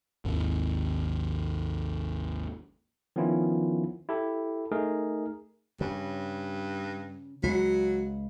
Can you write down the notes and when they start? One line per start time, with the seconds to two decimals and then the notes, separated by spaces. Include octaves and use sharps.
0.25 G#1 D#2
3.16 D#3 F3 B3 C#4 E4 F4
4.09 E4 G4 A4
4.72 A3 D#4 G#4 A#4
5.81 G2 C#3
7.43 C#2 F#3